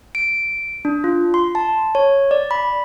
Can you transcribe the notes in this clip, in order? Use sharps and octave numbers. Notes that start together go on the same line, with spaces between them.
D7
D4
F4
C6
A5
C#5
D5
B5